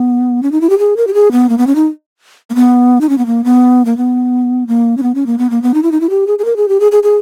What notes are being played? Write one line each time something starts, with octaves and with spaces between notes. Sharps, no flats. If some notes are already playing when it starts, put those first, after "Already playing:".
Already playing: B3
C#4
D#4
E4
G4
G#4
A#4
G4
G#4
B3
A#3
B3
C#4
D#4
A#3
B3
D#4
C#4
B3
A#3
B3
A#3
B3
A#3
C#4
B3
C#4
A#3
B3
A#3
B3
D#4
E4
D#4
E4
G4
G#4
G#4
A#4
G#4
G4
G#4
G#4
G#4